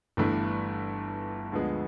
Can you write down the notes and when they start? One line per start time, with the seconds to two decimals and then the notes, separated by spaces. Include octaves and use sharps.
0.17 G1 G2 E3 A3 D4
1.52 D2 D3 F3 G#3 B3